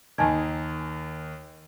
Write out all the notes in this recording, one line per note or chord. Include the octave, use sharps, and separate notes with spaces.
D#2 D#3 G#5 A5 G#6